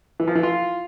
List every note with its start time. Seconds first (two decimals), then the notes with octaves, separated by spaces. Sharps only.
0.20 E3
0.27 F3
0.35 E3
0.43 F4